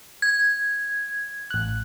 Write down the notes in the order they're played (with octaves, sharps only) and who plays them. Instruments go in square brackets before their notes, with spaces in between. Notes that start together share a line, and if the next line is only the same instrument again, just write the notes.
[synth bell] G#6
[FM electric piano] A1 F#6